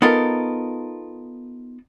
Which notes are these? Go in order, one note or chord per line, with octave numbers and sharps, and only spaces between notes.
B3 D#4 F4 A4 A#4